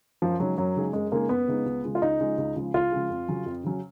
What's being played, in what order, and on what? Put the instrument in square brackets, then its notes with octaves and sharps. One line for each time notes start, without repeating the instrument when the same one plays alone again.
[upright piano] F#2 [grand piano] F3
[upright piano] C#3 G#3 D#4 G#4 [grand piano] F#3
[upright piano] F#2 [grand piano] F#3
[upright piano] C#3 G#3 D#4 G#4
[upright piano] F#2 [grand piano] G#3
[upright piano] C#3 G#3 D#4 G#4 [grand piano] A#3
[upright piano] F#2 [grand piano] B3
[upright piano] C#3 G#3 D#4 G#4
C#2
C#3 F3 G#3
[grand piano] F4
[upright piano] C#2 [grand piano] D#4
[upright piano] C#3 F3 G#3
C#2
C#3 F3 G#3
[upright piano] C#2 [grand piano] F4
[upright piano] C#3 F3 G#3
F2
C#3 F#3 C#4
F2
C#3 F#3 C#4